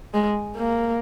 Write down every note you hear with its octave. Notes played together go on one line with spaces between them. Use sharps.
G#3
A#3